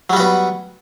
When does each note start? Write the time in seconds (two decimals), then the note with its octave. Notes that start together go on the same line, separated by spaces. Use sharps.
0.10 F#3
0.13 G3
0.16 F#4
0.20 B3